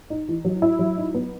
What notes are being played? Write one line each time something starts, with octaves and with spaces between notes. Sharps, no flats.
D#4
E3
F#3
E4
F#3
D#4
B3